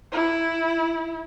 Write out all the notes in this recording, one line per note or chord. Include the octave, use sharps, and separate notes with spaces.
E4